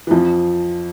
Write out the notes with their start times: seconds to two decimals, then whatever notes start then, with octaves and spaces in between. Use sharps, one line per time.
0.07 E3
0.11 F2 F3